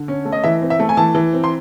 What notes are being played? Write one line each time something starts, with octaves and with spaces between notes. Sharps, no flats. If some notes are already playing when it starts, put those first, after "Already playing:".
Already playing: D3
C#4
A3
D#5
E3 E5
C4
E5
A3
G#5
E3 A5
E3
C4
C6